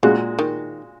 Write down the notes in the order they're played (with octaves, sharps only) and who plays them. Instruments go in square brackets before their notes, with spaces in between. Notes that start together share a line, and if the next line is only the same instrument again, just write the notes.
[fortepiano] A#2 G#3 F#4 [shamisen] C#3
[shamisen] D#3